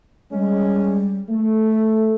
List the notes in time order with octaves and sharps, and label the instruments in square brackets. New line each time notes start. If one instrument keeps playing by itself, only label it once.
[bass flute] G3 [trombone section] G#3 C#4
[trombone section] A3
[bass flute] A4